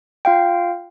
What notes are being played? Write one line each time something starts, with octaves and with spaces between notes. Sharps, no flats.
F4 F5 G5